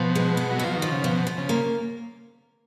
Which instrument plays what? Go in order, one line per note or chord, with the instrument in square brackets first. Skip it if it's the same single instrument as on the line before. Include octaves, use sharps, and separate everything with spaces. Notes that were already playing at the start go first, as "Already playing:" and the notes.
Already playing: [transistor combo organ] B2 [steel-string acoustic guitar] F3
[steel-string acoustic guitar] G#3
B3
[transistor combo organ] F#3
[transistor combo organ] F3 [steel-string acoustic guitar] F#4
[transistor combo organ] D#3
[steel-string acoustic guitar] F3
[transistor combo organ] C#3
[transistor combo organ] B2 [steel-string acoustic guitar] F3
[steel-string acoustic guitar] F3
[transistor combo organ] C#3
[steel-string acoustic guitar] A#3